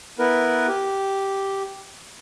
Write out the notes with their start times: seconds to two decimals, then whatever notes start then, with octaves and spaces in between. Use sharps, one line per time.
0.19 B3 E4 A#4 B4
0.68 G4